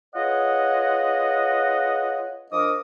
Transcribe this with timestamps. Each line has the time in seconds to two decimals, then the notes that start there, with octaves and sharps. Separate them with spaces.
0.15 F4 G#4 B4 C#5 D#5 F#5
2.52 F3 D4 A#4 D#5 D6 D#6